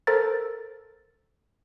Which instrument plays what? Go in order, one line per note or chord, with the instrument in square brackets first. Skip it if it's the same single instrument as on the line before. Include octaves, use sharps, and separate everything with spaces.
[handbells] A4 A#4 C5 A#5 A6